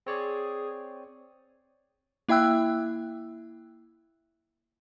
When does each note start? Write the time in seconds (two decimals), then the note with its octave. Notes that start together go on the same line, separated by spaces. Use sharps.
0.07 C4 G#4 C#5 D5
2.29 A#3 E4 E5 G5 E6 F#6